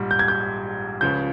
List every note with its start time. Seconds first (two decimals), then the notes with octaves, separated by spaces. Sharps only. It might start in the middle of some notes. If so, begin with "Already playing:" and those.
Already playing: A#1 G#2 G3
0.11 G6
0.19 G#6
0.28 G6
1.01 C#2 C#3 F3 G6